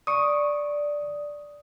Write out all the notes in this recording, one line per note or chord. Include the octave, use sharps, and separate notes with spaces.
D5 C#6 D#6